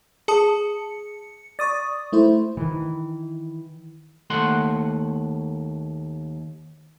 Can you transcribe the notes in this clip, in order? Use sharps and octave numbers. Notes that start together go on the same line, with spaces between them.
G#4 A5 D#6 C#7
D5 C#6 D#6 A6
A3 E4 C5
D#3 E3
D#2 A3 F#5 C6